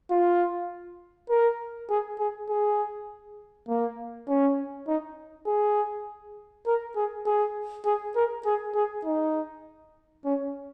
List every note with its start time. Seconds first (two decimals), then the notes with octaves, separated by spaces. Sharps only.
0.11 F4
1.30 A#4
1.90 G#4
2.19 G#4
2.49 G#4
3.68 A#3
4.29 C#4
4.87 D#4
5.47 G#4
6.67 A#4
6.96 G#4
7.26 G#4
7.85 G#4
8.16 A#4
8.45 G#4
8.75 G#4
9.05 D#4
10.25 C#4